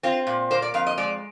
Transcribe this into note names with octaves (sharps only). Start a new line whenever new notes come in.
C4 F4
A#2
A#3 C5
D5
F2 F5
D#5
G#3 D5